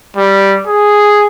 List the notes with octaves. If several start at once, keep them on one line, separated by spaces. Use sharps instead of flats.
G3
G#4